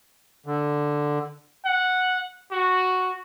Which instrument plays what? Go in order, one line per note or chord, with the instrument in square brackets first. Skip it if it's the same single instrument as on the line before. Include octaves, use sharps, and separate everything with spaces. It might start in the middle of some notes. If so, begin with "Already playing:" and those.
[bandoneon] D3
[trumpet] F#5
F#4